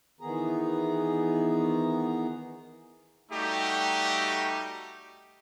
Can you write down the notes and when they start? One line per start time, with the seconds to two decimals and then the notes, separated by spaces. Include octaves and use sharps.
0.21 D#3 E3 B3 G#4 A#5
3.31 G3 A3 D#4 F#4 G4